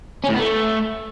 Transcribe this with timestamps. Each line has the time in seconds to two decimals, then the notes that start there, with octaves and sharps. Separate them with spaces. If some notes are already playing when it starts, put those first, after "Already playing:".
0.24 C#4
0.29 A2
0.34 B3
0.39 A3